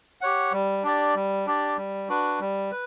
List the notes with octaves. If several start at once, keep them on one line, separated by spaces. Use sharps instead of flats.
G4 C#5 F#5
G3
D4 G4 D5
G3
D4 G4 D5
G3
D4 F#4 B4
G3
B4